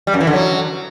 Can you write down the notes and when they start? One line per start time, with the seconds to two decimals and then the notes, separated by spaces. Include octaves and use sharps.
0.07 G3
0.14 F#2
0.20 E3
0.27 D3
0.34 F#3